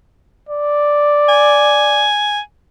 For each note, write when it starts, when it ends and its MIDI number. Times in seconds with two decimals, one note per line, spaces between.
0.49 2.09 74
1.28 2.40 80